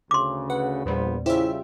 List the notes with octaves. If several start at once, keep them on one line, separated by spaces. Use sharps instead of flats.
D2 C#3 C6 D6
B4 F#5
A#1 E2 A#2 G3 B3 C5
C#3 G3 E4 F4 G4 C5 E5